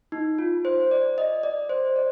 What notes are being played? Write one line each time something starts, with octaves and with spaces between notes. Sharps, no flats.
D#4
F4
C5
D5
D#5
D5
C5
D5